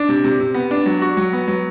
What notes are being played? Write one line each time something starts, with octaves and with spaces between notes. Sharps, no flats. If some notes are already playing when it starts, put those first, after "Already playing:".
Already playing: D4
C3
C3
C3
B3
D4
F#3
F#4
F#3
B3
F#3